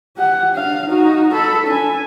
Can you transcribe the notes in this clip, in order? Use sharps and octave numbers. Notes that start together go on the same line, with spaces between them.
G4 F#5
D4 F5
D#4 F#4
A4 B5
D4 G#5